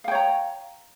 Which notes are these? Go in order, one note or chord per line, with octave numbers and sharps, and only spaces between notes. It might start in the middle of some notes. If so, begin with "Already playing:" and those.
C#5 F5 G5 A#5